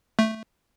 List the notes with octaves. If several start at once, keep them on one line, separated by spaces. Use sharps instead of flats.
A3